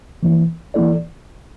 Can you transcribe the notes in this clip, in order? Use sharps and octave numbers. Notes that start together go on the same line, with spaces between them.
E3 A#3 E4
E3 A#3 E4 A4 D5